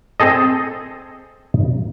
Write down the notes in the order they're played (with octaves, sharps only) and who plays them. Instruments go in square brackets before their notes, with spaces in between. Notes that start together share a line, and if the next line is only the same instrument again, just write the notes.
[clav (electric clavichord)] C4 G#4 A4 D#5